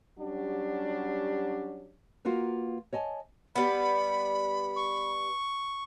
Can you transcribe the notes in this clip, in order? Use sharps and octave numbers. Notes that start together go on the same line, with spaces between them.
F#3 G3 C#4 D4 F#4 G4
A#3 F4 F#4 A#4 B4
C#5 D#5 G#5 A5
G3 B3 B5
C#6